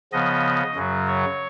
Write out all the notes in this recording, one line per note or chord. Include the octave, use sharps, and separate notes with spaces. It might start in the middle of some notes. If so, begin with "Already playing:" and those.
C#3 F3 B3 D#5
F#2 C#3 F#3
C#5